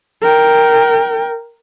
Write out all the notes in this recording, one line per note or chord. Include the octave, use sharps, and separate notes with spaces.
A#4 G5